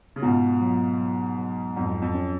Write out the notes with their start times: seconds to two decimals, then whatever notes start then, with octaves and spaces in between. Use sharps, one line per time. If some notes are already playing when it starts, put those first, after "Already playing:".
0.16 C#3
0.22 G#2 B2 F4
0.61 F#3
0.99 F#3
1.38 F#3
1.76 F2 G#2 F#3
2.02 F2
2.15 C#4